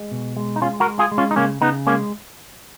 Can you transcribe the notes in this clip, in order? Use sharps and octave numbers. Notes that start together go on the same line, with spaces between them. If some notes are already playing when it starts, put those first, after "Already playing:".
Already playing: G#3
B2
G#3
D#4
G#3 C#4 F4
F#4 A#4
G#3
F4 G#4
G#3
C#4 F4
D#4
C#3 A#3 C#4
C#3 B3 D#4
G#3 A#3 C#4